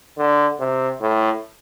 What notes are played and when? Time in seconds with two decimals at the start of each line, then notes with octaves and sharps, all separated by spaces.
0.18 D3
0.60 C3
1.01 A2